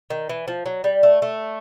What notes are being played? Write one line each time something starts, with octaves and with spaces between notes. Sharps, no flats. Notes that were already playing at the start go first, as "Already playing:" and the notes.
D#3
E3
F3
F#3
G3
A3
A3